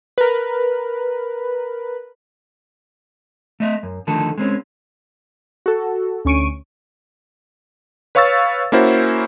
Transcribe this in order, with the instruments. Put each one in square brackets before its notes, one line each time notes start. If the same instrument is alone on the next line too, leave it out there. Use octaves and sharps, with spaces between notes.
[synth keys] A#4 B4
[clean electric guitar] A3 D#5 E5
F#2
D3 D#3 F3 A3 A4
G#3 C4 C#4
[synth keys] F#4 A4
D2 C#4 C#6 D7 D#7
[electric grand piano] B4 C#5 F5 C#6 E6 A6
A#3 C#4 E4 F#4 C5